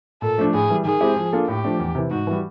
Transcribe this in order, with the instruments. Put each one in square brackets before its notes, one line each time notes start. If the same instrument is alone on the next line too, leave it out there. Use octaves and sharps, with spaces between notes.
[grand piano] A#2 [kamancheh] A4
[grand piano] F3 A3 D4
[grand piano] A2 [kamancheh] G#4
[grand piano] E3 G3
[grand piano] D#3 [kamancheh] G#4
[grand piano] G#3 C4 E4 G4
F3
A#3 D4 F4 A4
[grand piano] A2 [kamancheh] G4
[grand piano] F3 A3 D4
E2
C3 E3
[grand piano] G#2 [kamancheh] F#4
[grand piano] E3 G3